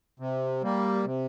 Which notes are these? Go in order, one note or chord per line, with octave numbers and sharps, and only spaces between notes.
C3
G3 A#3
C3